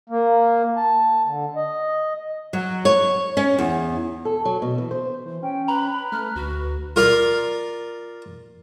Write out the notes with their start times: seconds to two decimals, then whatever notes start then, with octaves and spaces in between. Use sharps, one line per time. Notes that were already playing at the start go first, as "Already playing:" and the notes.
0.09 A#3
0.76 A5
1.25 D3
1.56 D#5
2.53 F#3
2.85 C#5
3.37 C#4
3.59 E2
4.25 A4
4.45 F#3
4.62 B2
4.78 E3
4.91 C5
5.26 E3
5.43 C#4 G5
5.68 B4 A#5 B5
6.12 A3 F6
6.36 D2 F#4
6.96 F4 A#4 D5 F5